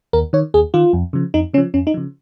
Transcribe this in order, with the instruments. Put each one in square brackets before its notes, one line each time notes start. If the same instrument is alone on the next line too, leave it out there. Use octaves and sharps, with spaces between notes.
[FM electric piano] D#2 A#4
D#3 C#5
D#2 G#4
D#3 F4
F2
C#3 F3
F2 D#4
C#3 C#4
F3
F2 C#4
D#4
C#3 F3